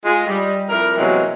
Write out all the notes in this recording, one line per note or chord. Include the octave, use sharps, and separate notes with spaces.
G#3 F4
G3 D#5
F2 G3 E4 A#4
C3 E3 F#3 G#3 A#3 B3